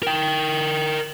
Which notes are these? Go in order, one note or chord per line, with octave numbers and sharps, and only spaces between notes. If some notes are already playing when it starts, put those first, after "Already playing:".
A#4 G5